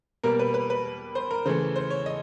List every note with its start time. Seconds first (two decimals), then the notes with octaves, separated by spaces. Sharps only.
0.23 B2 G3 A#3 A#4
0.39 B4
0.54 B4
0.70 B4
1.15 C5
1.31 A#4
1.45 C#3 E3 A3 C5
1.76 C5
1.90 C#5
2.06 D#5